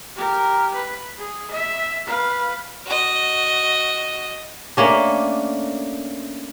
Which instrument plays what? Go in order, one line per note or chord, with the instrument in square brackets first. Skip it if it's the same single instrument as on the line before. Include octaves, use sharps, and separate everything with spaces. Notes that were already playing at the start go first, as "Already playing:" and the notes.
[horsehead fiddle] G4 A#4
B4
G#4
E5
B4 F5
[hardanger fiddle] F#4 D#5
[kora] A3 A#3 C#4 D4